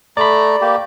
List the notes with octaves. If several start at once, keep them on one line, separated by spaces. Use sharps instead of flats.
A3 D5 A#5 B5
A#3 G4